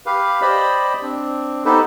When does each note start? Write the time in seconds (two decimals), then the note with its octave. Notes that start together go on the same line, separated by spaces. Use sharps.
0.06 G4 B4 F5
0.42 G4 C5 D5 D#5 B5
1.02 C4 D4
1.65 B3 D#4 G4 A4 B4 C5